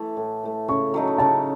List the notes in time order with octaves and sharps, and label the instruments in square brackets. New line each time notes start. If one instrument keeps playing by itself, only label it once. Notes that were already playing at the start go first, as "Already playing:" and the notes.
Already playing: [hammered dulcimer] E3 A3
A2
E3 A3
[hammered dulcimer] C#3 [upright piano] C#6
[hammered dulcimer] F#3 A3 D#4
[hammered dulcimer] C#3 [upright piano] A5